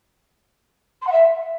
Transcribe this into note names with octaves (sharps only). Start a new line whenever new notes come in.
C6
F#5
E5